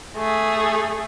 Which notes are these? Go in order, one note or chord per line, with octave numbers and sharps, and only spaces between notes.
A3 G#4